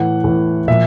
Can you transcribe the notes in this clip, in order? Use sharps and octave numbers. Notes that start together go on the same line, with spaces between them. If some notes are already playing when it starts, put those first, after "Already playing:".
Already playing: A2 E3 F#5
A2 E3
A#2 F3 E5